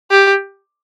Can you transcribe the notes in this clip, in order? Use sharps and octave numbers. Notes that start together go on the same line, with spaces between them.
G4